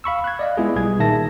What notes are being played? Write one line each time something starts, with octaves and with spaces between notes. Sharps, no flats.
F5 B5 C#6 E6
F#6 G#6
D5 D#5 F5
G#3 B3 E4 F4 G#4
B1 G3 G#4 G#6
A#2 D#3 E5 A5 A#6